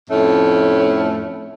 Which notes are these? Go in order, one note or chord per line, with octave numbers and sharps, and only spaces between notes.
F2 A2 A3 C#4